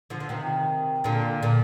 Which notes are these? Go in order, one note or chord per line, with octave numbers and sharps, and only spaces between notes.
D3 F3
F3
C3 D#3
A#2 D3
A#2 D3